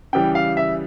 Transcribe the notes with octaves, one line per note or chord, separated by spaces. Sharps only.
C#3 E3 G3 G5
F5
E5